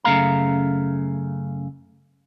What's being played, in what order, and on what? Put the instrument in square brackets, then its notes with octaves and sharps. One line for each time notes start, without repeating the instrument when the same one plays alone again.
[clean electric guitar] F#2 C#3 A3 F5 A#5